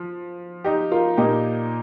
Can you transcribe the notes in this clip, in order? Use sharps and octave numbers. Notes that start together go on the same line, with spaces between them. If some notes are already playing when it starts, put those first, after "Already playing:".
Already playing: F3
D#4 G4
F4 A#4
A#2 A#3 D#4 G4